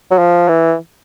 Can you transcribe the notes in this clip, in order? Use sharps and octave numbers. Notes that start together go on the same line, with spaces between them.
F#3
F3
E3